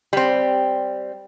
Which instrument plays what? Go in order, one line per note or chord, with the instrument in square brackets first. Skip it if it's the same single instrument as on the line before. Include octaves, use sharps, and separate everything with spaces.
[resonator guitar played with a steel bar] G3 C4